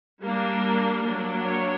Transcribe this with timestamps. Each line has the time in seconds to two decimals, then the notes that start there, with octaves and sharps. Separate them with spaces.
0.23 G3 A#3 D4
1.04 F#3 A#3 D4
1.46 C#5